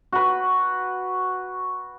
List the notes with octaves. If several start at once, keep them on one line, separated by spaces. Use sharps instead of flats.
F#4 B4